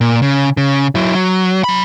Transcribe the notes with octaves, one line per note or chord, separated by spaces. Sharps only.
A#2
C#3
C#3
F#3 E4
F#3
F#3 B5